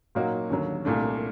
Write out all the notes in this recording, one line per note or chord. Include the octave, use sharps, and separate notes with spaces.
A#2 F#3 A#3 D#4 F#4
D#2 D3 F#3
C2 A#2 A3 D4